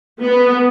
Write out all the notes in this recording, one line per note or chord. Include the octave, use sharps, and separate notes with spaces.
B3